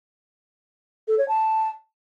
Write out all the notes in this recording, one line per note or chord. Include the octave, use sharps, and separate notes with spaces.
A4
C#5
A5